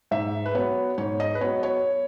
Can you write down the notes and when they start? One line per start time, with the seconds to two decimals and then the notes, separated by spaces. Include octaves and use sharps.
0.11 G#2 E5
0.46 B4
0.55 F#3 B3 C#5
0.98 G#2 C#5
1.20 D#5
1.35 B4
1.41 F#3 B3 C#5
1.63 C#5